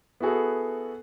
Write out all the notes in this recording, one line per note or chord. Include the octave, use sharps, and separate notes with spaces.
B3 E4 F#4 G#4 A4